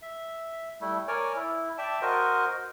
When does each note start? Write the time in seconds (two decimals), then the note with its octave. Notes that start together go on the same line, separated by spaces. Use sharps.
0.02 E5
0.81 G3 A3 E4
1.08 A#4 C#5 D5 G#5
1.36 E4
1.78 D5 E5 G5 A5
2.02 F#4 A#4 C5 D#5